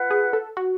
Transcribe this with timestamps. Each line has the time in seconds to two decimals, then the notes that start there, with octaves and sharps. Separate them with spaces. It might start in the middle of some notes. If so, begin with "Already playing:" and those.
Already playing: F4 B4 F#5
0.10 G#4
0.33 A4
0.57 F#4